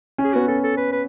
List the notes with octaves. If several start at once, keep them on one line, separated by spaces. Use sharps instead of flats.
C#4
G#4
B3 F#4
C#4 A4
A4
B4
B4